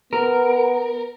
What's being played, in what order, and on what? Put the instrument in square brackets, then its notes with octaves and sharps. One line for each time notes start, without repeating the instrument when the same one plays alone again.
[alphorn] B3 [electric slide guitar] A#4